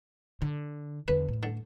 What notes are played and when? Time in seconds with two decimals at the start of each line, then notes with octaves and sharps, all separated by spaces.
0.42 D3
1.08 E2 D3 B4
1.28 A2
1.43 D3